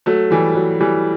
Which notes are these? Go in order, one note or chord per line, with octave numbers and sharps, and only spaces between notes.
F#3 A3
E3 G3
F#3
E3 G3